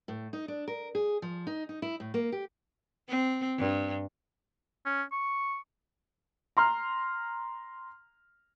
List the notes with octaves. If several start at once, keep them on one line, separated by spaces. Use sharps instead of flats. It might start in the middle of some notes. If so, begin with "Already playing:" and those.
A2
D#4
D4
A#4
G#4
F3
D#4
D#4
E4
A2
A#3
G4
C4
G2
C#4
C#6
A#5 C6 F6